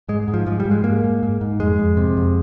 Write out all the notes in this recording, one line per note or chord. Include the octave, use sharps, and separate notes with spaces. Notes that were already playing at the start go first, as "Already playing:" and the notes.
G#2 G#3
G#2
F3
G#2 F3
G3
G#2
G#3
G#2 A#3
G#2
G#2
G#2
F2 G#3
F2
C3
F2